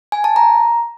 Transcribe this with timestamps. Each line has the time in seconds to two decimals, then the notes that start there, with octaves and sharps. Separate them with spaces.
0.12 G#5
0.24 A5
0.36 A#5